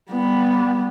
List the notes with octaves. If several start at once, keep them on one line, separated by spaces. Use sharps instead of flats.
G3 B3